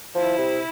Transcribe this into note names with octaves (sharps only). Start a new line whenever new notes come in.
F3 E4
C3